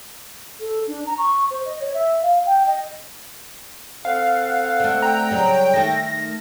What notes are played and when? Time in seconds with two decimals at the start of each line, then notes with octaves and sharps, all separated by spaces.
0.60 A4
0.87 D4
1.06 A#5
1.18 C#6
1.50 C5
1.65 D#5
1.80 C#5
1.93 E5
2.22 F5
2.46 G5
2.66 D#5
4.05 C4 A4 F5 F#5
4.80 D3 A3
5.02 G5 A#5
5.31 C#3 F#3 G3
5.74 D#3 A3 A#6